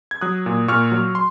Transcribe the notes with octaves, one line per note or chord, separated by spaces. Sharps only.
G#6
F#3 D#6 F#6
A#2
A#2 C#6 F6
F#3
C6